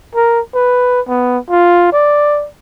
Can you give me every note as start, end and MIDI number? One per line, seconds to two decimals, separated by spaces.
0.15 0.40 70
0.54 1.01 71
1.08 1.38 59
1.50 1.91 65
1.93 2.47 74